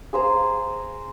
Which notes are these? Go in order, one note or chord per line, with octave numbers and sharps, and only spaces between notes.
G#4 C5 A#5